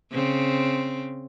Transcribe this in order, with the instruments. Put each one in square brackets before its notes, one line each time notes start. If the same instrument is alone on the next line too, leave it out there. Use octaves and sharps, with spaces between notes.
[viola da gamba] C#3 C4